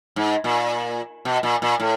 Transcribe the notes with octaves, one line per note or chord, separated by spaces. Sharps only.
G#2
A#2
B2
A#2
A#2
A2